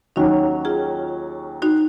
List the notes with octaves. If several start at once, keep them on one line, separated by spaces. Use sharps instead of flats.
D#2 D#3 F#3 C#4 D#4 F#4
F4 G#4
D#4 F#4